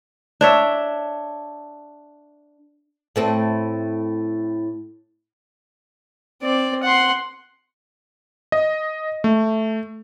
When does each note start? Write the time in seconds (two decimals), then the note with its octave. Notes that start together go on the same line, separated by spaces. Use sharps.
0.41 D4 C#5 E5
3.16 A2 A3 C4
6.42 C4 D5
6.83 F#5 C6
8.52 D#5
9.24 A3